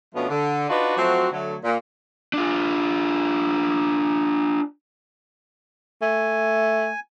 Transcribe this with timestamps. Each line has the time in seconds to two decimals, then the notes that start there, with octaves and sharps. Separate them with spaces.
0.15 B2 F3 A3 B3 C#4 D4
0.30 D3
0.70 D4 D#4 F4 F#4 B4 D5
0.97 F3 F#3 A3 C4 F#4
1.32 D3 F#3 A3
1.63 A#2
2.33 D4 F4
6.02 A3 G#5